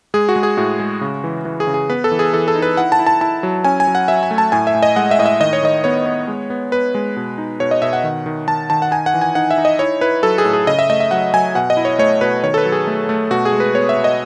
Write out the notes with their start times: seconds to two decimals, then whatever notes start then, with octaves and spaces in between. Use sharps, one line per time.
0.14 G#3 G#4
0.29 F#4
0.36 G#3
0.43 G#4
0.57 A2 F#4
0.80 G#3
1.01 C#3
1.24 E3
1.45 E3
1.60 G#4
1.67 C#3
1.74 G#4
1.90 B3 B4
2.04 A4
2.11 E3
2.19 G#4
2.33 E3 A4
2.48 A4
2.56 D#4
2.62 B4
2.77 E4 F#5
2.92 A5
2.99 E4
3.07 A5
3.21 E4 A5
3.43 F#3
3.65 C#4 G#5
3.80 G#5
3.87 F#3
3.95 F#5
4.08 F#3 E5
4.23 G#5
4.31 A3
4.38 A5
4.52 A2 G#5
4.67 E5
4.74 A2
4.83 D#5
4.96 G#3 F#5
5.11 E5
5.19 A2 D#5
5.26 E5
5.40 D#3 D#5
5.53 C#5
5.63 D#3 D#5
5.84 B3 C#5
6.06 B3
6.28 G#3
6.50 B3
6.72 B3 B4
6.95 G#3
7.16 B2
7.38 D#4
7.60 B2 C#5
7.71 D#5
7.82 B2 E5
7.93 F#5
8.04 D#3
8.26 D#3
8.47 D#3 A5
8.70 D#3 A5
8.82 F#5
8.91 D#4 G#5
9.06 F#5
9.14 E3
9.21 G#5
9.35 D#4 F#5
9.51 E5
9.58 D#4
9.65 D#5
9.79 E4 C#5
10.01 E4 B4
10.23 F#3 A4
10.38 G#4
10.45 A2
10.53 G#4
10.67 C#3 D#5
10.79 E5
10.90 A3 D#5
11.00 E5
11.11 F#3 F#5
11.33 F#3 G#5
11.55 B2 F#5
11.70 D#5
11.77 E4
11.85 C#5
11.99 A3 C#5
12.21 B2 B4
12.43 D#3 C#5
12.54 A4
12.58 B4
12.65 F#3
12.72 G#4
12.87 A3
13.09 A3
13.30 B2 F#4
13.45 G#4
13.53 G#3
13.60 B4
13.75 B3 C#5
13.89 E5
13.96 B2
14.04 D#5